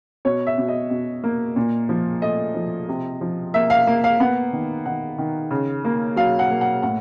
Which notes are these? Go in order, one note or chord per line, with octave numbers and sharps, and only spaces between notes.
B2 C#5
E5
B2
D#5
B2
A#3
A#2
F3
A3 D#5
F3
C3
F3
A#3 E5
F5
A#3
F5
B3 F#5
D#3
D#3 F#5
D#3
C#3
A#3
F#3 F5
F#5
A#3
F#5
A2 F#5